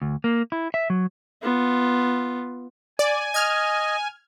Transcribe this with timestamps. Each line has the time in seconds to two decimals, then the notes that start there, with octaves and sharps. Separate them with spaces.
0.02 D2
0.24 A#3
0.52 E4
0.74 E5
0.90 F#3
1.43 B3 F4
2.99 D5 G#5
3.34 D#5 F6 G#6